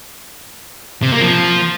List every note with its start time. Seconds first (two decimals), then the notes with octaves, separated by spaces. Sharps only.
1.02 C3
1.12 A#3
1.21 F3